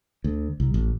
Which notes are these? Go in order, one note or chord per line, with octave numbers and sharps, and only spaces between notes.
D2
C2
A1